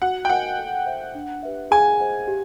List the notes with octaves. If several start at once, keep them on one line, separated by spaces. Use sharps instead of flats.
F#4 F#5
G5
A#4 D#5 F#5 G#5
A4
C5 E5
D4
G4 B4 E5
G#4 G#5
C5 D#5 F#5
G4